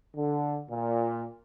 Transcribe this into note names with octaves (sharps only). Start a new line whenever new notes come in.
D3
A#2